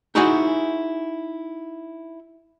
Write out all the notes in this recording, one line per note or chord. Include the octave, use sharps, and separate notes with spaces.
D#4 E4 F#4 G#4 C5 G#5